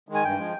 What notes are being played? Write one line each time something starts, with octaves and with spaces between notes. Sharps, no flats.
D#3 G#3
G#5
G2 G5
F3 G#3